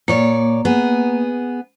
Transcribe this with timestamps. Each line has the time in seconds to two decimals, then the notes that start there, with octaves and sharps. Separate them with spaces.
0.08 A#2 A#3 C#5 D5
0.65 B3 G#4